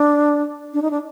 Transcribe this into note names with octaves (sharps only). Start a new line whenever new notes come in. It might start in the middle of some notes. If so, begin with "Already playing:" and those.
Already playing: D4
D4
D#4
D4